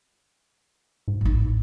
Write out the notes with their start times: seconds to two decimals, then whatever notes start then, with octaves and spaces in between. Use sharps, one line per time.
1.08 G#2
1.21 A1 D#4